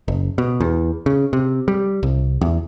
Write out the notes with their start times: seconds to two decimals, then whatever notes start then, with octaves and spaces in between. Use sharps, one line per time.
0.08 F#1
0.38 B2
0.60 E2
1.06 C#3
1.33 C3
1.68 G3
2.03 C2
2.41 E2